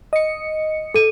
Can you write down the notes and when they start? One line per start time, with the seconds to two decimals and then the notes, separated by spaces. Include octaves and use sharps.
0.13 D#5 C#7
0.94 A4 D#7